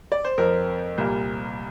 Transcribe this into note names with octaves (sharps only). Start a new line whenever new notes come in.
D5
C5
F2 F3 C4 A#4
C2 A#2 G3 A#3